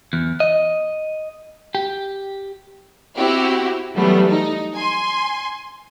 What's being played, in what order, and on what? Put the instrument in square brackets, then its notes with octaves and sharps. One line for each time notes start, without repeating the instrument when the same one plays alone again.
[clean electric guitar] E2
D#5
G4
[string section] C4 E4 F#4 G4
E3 F#3 G3 A3 B3
D#4
G#5 C6